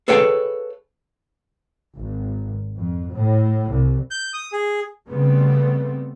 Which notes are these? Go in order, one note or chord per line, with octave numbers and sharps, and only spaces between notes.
G#4 A4 B4 C#5 F5 G5
G#1
F2
A2
C2
G6
D#6
G#4
C#3 G3 A3 B3 C4